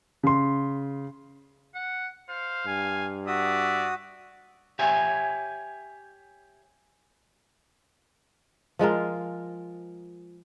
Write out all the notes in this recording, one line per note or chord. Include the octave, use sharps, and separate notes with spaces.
C#3 C6
F#5
C5 F5
G2 G#5
F#4 D5 E5 D#6
G4 C#5 E5 G#5
F3 G#3 F4 A#4